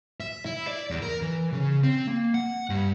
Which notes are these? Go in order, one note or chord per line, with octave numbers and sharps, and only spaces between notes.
E5
E4
D5
E2
A#4
E3
C#3
C4
A#3
F#5
G2